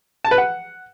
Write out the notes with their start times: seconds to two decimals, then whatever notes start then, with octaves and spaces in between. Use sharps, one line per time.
0.25 A5
0.31 B4
0.38 F#5